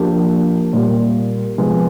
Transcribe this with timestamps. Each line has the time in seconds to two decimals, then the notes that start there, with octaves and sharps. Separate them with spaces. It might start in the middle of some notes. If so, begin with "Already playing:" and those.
Already playing: F3 A#3 D4 G4
0.73 A#2 G3 A#3
1.58 C3 F3 G#3 B3